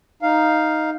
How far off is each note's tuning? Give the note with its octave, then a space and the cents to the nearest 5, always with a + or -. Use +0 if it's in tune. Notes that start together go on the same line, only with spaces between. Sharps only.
D#4 +0 F5 +0